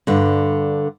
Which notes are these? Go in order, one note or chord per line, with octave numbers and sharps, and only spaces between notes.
G2 D3